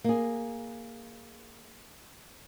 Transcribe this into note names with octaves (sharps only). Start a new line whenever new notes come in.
A#3 G#4